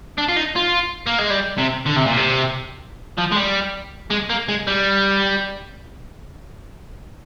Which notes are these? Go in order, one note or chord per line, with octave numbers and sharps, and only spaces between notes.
D4
F4
D#4
F4
A#3
G#3
G3
C3
D3
C3
A#2
C3
F3
G#3
G3
G#3
A#3
G#3
G3